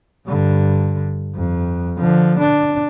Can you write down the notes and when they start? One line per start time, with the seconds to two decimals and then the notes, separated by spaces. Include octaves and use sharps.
0.27 G2 D3
1.35 F2
1.99 D3 F3
2.39 D4